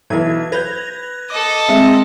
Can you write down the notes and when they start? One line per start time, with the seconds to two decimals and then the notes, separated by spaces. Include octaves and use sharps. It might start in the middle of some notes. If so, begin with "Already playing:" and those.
0.10 B1 E3 G#6
0.52 B4 G6 G#6 A#6 F7
1.30 A4 D#5 D6
1.69 G#3 C4 E5